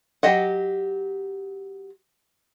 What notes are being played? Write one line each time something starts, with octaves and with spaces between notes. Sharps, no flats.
F#3 G4 D#5 F#5